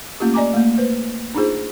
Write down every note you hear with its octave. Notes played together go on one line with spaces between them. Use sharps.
A3 A#3 C#4 F4 G4
D5 D#5 G#5 A#5 D6
A3 A#3
B4 C5
D4 D#4 F4 G#4 C5